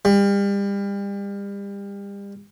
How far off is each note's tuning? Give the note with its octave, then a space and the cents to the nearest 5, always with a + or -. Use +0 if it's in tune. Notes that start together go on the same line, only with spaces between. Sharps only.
G3 +35